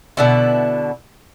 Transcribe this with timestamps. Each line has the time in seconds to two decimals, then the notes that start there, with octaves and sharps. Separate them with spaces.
0.17 B2 D3 E4